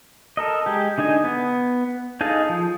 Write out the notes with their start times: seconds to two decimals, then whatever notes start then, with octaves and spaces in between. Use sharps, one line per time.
0.37 A4 A#4 D#5
0.66 G#3 G4
0.98 D3 D#4 D#5 G#5
1.24 B3
2.21 D#4 G#4 A4 D#5 F5
2.49 F3